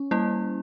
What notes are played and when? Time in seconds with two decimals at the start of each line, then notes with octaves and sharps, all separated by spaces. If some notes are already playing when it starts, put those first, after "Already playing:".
Already playing: C#4
0.11 G3 A#3 E4